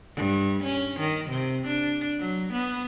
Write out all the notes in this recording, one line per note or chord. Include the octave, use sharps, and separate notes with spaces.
G2
C#4
D#3
C3
D4
F#3
B3